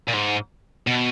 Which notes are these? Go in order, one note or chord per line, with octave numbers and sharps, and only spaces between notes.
A#2
G#2
B2